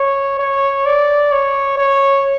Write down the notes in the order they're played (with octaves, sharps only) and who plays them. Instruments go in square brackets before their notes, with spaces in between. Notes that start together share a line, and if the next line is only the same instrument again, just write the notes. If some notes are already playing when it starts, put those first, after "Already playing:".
Already playing: [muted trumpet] C#5
C#5
D5
C#5
C#5